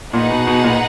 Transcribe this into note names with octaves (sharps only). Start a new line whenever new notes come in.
A#2 D#4 G#4 B4 F#5
B2
B2
A#2